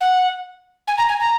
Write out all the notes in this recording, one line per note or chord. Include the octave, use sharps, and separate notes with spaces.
F#5
G#5
A#5
G#5
A#5